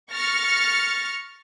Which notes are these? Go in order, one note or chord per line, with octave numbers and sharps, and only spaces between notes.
C#6 F6 A6 A#6 C#7